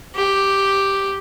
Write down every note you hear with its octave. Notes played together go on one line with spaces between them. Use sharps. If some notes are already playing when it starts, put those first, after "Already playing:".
G4